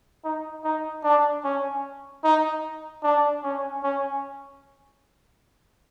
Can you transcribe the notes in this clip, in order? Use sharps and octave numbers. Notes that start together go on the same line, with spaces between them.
D#4
D#4
D4
C#4
D#4
D4
C#4
C#4